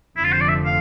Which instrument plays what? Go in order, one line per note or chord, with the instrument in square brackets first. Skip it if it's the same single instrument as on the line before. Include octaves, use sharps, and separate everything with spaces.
[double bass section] F1 F2 D3 F3 [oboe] E4
[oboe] F4
C5
D5
E5
F5